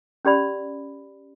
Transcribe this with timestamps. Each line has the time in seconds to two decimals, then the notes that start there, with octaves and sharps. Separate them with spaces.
0.25 C#4 G4 D5 B5